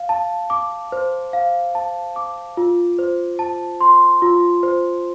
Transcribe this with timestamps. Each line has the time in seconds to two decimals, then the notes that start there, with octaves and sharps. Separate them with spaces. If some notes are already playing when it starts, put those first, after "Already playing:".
Already playing: F5
0.09 A5
0.50 D6
0.92 C5
1.33 F5
1.75 A5
2.16 D6
2.57 F4
2.99 C5
3.39 A5
3.81 C6
4.22 F4
4.63 C5